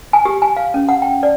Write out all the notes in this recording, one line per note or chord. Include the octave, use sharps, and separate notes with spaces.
G#5
G4
G#5
F5
C#4
F#5
G5
D5